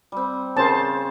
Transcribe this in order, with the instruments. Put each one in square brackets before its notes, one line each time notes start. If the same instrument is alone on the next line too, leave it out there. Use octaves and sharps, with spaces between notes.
[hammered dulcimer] G3 C4
[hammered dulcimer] C#3 [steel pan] A#4 C5 A5